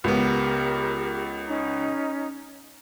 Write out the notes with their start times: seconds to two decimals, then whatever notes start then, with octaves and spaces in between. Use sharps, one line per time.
0.04 C#2 B3 G4 A#4 F6
1.47 C#4 D#4 A#5